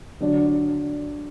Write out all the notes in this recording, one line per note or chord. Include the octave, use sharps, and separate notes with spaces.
D3 F#3 D4